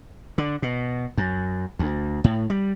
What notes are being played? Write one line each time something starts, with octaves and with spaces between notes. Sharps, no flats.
D3
B2
F#2
D2
A2
G3